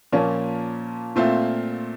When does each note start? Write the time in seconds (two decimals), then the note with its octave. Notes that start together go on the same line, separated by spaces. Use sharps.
0.12 A#2 F3 A#3 C#4
1.16 A#2 A3 C4 F4